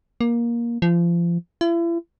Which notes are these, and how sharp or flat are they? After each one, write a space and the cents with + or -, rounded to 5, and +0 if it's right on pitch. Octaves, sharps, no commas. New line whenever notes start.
A#3 +15
F3 -30
E4 +40